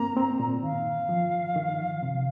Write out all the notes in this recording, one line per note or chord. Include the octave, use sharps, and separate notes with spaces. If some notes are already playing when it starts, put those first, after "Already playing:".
Already playing: A#3 C4 A#5
C4
A#2
D#3 F5
F3
D#3
C3